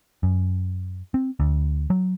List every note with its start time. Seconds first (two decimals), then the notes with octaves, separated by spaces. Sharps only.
0.23 F#2
1.14 C4
1.40 D2
1.90 F#3